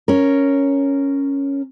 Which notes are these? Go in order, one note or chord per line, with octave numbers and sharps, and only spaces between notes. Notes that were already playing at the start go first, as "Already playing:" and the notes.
C#4 A#4